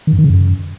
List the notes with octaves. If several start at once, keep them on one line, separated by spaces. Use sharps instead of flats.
D#3
G2
D#3
C#3
F#2